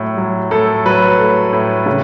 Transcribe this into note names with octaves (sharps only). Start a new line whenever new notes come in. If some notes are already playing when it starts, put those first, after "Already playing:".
Already playing: A2 F#3 A3
F#3
A2 A4
F#3 B4
A3
A2
C#3